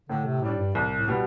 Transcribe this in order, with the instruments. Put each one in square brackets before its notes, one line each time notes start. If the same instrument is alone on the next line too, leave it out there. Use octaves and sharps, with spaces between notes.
[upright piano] A2 [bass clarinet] D3
[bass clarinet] C3
[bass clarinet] A2 [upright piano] G3 D4
[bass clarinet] G2
[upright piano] C2 [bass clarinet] A2
[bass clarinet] A2
[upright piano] B2 G3 B3